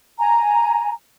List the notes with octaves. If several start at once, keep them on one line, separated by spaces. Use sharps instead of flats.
G#5 A#5